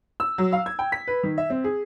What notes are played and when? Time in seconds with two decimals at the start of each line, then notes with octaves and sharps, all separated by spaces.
0.20 E6
0.38 F#3
0.53 F5
0.66 G#6
0.79 G5
0.92 B6
1.08 B4
1.23 D#3
1.38 E5
1.50 C4
1.64 G#4